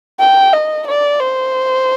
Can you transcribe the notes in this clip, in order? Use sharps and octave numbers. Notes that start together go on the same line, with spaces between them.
G5
D#5
D5
C5